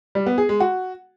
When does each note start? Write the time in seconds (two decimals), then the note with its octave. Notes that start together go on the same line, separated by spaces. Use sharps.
0.15 G3
0.26 B3
0.38 G#4
0.49 G#3
0.60 F#4